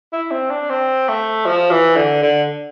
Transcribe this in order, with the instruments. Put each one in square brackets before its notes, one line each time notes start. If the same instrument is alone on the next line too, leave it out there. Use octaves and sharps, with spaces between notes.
[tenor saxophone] E4
C4
D4
C4
A3
F3
E3
D3
D3